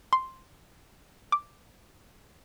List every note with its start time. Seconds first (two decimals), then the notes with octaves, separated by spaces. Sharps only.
0.13 C6
1.32 D6